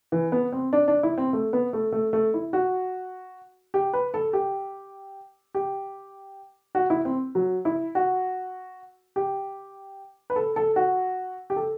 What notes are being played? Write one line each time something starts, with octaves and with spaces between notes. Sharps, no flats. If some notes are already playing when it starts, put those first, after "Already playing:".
E3
B3
C4
D4
D4
E4
C4
A3
B3
A3
A3
A3
E4
F#4
G4
B4
A4
G4
G4
F#4
E4
C4
F#3
E4
F#4
G4
B4
A4
A4
F#4
G4
A4